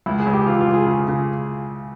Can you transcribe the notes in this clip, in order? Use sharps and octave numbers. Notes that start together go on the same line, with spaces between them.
C#2 E4
G#4
C#2
G4
E3 F4
F4
C#2
G#4
C#3
C#3